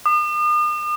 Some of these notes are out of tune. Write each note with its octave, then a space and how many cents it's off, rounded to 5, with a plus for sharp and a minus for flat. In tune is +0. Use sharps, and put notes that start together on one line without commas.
D#6 -45